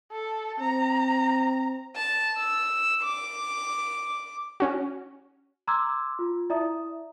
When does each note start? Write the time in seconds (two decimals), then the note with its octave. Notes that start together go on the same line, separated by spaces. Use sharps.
0.12 A4
0.60 C4 A#5
1.96 A5
2.37 E6
3.02 D6
4.60 C#4 F#4
5.68 A#5 C6 D6 E6 F6 G#6
6.19 F4
6.50 E4 D5 E5 A#5 D#6